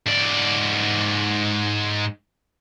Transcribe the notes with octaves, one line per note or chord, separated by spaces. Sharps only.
G#2 D5